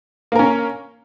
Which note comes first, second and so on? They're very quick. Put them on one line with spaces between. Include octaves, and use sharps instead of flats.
A#3 A#4 C#4